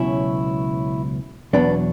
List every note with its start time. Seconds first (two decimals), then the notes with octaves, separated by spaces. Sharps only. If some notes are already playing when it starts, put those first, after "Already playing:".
Already playing: C#2 B2 F#3 C#4 E4
1.53 E2 B2 F#3 B3 D4